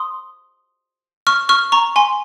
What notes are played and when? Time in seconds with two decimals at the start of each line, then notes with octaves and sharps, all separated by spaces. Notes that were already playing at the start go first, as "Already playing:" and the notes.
Already playing: C6 D#6
1.27 C#6 F6
1.49 C#6 F6
1.72 A#5 C#6
1.96 G#5 C6